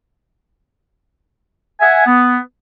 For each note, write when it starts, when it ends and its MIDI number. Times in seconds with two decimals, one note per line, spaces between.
1.80 2.02 76
1.80 2.02 78
1.80 2.02 80
2.06 2.38 59